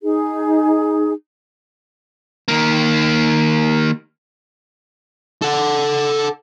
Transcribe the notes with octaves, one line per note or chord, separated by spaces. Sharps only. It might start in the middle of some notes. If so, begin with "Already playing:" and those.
D#4 G#4
D#3 A#3
A4 F#5